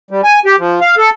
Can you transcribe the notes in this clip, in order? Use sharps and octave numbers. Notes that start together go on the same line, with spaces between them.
G3
G#5
G4
F3
F5
A4